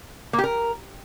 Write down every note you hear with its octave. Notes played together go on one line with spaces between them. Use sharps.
A#3
G4
A#4